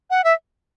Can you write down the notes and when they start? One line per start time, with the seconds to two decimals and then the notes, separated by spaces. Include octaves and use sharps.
0.10 F#5
0.24 E5